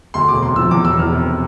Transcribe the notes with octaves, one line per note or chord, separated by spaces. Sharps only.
D2 C6
E1 D6
C3 C6
F3 E6
E2 D6
E1 E6
E2 F6
C3